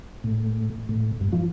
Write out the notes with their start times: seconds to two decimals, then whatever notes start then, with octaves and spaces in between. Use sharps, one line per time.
0.24 A2
0.89 A2
1.21 G2
1.32 F3